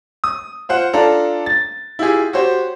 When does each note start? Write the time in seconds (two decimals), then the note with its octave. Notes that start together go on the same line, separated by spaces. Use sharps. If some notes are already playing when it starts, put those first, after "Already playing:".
0.24 D#6
0.69 F4 C5 F#5
0.93 D4 F4 A4 A#5
1.46 A6
1.99 E4 F4 G4 G#4
2.33 F#4 G4 C5 C#5